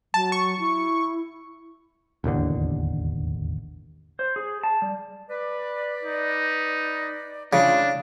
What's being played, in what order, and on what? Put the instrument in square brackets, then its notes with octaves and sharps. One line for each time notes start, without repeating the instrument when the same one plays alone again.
[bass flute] F#3 [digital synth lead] A5
[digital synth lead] C#6
[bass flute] E4
[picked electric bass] E1 A1 D#2 D3
[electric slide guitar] C5
G#4
A5
G3
[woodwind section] B4 D5
[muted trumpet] D#4
[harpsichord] C#3 [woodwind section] A3 E4 F4 [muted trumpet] D4